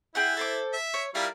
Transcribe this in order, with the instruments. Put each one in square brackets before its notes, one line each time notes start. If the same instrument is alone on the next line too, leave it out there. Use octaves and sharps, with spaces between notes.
[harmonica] E4 [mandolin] G4 G#4 F#5
[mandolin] A4 C5 D6
[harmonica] E5
[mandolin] C#5
[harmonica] G3 E4 F5 [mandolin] F4 A#4